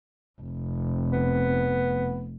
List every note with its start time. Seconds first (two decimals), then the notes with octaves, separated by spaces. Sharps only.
0.41 F1
1.13 B3